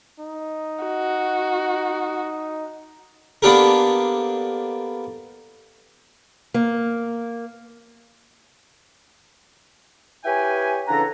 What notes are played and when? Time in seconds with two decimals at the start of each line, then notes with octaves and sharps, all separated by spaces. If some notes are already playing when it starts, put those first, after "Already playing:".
0.19 D#4
0.85 F#4
3.42 A#3 B3 D4 G4 A4 A#4
6.54 A#3
10.25 E4 G4 B4 C#5 G5 G#5
10.88 C#3 E3 D4 A4 F#5 A#5